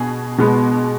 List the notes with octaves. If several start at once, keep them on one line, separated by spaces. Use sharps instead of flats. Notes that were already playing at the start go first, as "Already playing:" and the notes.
Already playing: B2 G#4
B2 G#3 B3